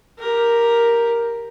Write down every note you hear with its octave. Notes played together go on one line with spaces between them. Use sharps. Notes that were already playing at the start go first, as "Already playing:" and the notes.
G4 A#4